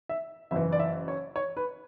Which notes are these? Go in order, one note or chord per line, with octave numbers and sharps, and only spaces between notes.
E5
F#1 F#2 E3 E5
D5
E5
C#5
C#5
B4